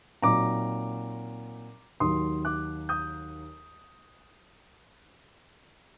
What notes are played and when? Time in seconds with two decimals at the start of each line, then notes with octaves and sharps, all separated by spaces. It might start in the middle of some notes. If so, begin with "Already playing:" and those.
0.22 A#2 F#3 C4 D#4 A#5 D6
2.00 D#2 D#3 F#3 C6 D#6
2.45 D6 F#6
2.89 D#6 G6